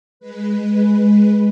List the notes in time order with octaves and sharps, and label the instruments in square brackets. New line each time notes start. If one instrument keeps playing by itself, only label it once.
[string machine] G#3 B4